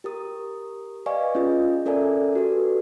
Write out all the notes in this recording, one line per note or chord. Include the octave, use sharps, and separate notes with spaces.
G4 A#4 D#6
B4 D5 D#5 F5 G#5 C#6
C#4 F4 G#4 D#5
C#4 A4 A#4 D5 E5 G#5
F#4 G4 A4 B4